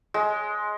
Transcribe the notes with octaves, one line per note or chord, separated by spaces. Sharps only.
G#3